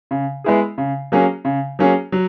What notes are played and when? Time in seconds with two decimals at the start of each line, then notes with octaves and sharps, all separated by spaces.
0.11 C#3
0.44 G#3 B3 E4 G#4
0.78 C#3
1.12 F#3 A#3 C#4 G#4
1.45 C#3
1.79 F#3 A#3 C#4 G#4
2.12 F#3